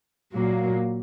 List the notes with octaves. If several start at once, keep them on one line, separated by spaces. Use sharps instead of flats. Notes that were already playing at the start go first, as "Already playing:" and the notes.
A#2 F#3 A#3